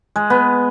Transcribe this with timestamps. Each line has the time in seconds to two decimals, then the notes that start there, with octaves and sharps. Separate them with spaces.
0.16 G#3
0.30 B3